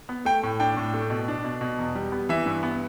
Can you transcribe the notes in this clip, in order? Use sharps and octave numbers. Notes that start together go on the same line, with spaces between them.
B3
A3 G5
A2
D4 G5
A2
A3
B2
D4
B2
B2
E2
G3
B3
E3 E5
G2
B3